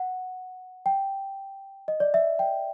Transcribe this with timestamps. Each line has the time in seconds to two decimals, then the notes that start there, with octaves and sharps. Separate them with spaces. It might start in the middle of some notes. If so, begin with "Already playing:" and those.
Already playing: F#5
0.86 G5
1.88 D#5
2.00 D5
2.14 E5
2.39 G5